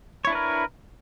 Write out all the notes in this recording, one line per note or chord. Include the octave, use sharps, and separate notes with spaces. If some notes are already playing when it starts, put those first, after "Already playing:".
D4 E4 A#4 B4 C#5